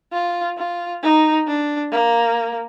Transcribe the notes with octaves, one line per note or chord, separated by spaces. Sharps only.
F4
F4
D#4
D4
A#3